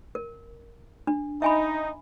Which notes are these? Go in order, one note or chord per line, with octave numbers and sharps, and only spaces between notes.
A#4
D4
D#4 E5 G#5 B5